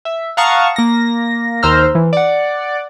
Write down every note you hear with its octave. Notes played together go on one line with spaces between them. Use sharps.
E5
F5 F#5 A5 A#5 C#6 D#6
A#3 A#6
D#2 C5 A#5 E6 F6
E3
D5 F#5